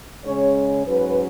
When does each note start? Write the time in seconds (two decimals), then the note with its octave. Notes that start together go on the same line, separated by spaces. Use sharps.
0.24 C#3 G#3 C#4 C#5
0.55 C#5
0.85 G#2 F#3 C#4 B4